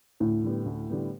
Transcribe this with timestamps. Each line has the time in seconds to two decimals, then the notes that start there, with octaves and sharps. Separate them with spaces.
0.20 D2 A2
0.44 D3 G3 B3
0.66 D2
0.90 D3 G3 B3